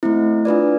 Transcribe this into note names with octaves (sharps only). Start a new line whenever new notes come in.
A3 C4 E4
D4 F4 B4 D5